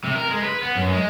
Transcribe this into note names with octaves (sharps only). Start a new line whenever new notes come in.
C3
A#4
G#3
B4
B3
F#2
G#3